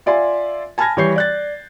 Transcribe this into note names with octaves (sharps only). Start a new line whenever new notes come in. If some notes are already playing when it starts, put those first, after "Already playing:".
F4 D5 E5 G#5 C6
G#5 A5 B5 F6 G#6 A#6
E3 G3 C#5 C#6 G6 C7
D5 F#6 A6